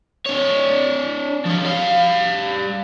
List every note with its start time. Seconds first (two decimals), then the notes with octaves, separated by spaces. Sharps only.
0.26 D4 C#5
1.46 F3 C#4
1.65 G3 F5